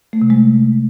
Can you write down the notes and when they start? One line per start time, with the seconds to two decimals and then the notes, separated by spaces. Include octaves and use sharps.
0.13 A3
0.22 C3
0.30 G#3